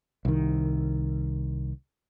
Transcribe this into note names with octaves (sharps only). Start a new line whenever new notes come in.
C2 D#3